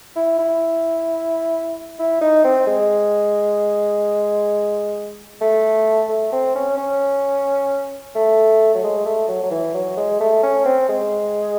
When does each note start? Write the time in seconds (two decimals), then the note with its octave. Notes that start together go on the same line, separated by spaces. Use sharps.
0.16 E4
0.39 E4
1.99 E4
2.21 D#4
2.44 C4
2.67 G#3
5.41 A3
6.09 A3
6.32 C4
6.55 C#4
6.77 C#4
8.15 A3
8.74 F#3
8.83 G#3
9.05 A3
9.28 F#3
9.43 F#3
9.51 E3
9.74 F#3
9.97 G#3
10.20 A3
10.43 C#4
10.65 C4
10.89 G#3